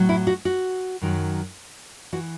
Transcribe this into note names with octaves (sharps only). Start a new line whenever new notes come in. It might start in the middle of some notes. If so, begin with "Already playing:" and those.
Already playing: A2 F#3
E4
F#4
F#4
F#2 D#3 F#3
E3 F#4